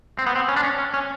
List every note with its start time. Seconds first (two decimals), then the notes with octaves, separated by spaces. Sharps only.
0.19 C4
0.26 B3
0.36 C4
0.48 C#4
0.56 D4
0.63 C#4
0.78 C#4
0.94 C#4